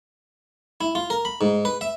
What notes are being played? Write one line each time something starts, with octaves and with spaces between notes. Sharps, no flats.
E4
F4
A#4
B5
G#2
B4
E5